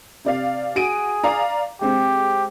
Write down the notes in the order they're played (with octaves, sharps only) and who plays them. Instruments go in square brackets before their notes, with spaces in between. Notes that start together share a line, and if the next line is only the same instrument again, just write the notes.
[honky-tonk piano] C3 D5 F5
[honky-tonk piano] F#4 D7 D#7 [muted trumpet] G#4
[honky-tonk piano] D5 F5 A#5
[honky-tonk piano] G#3 C4 [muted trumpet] G4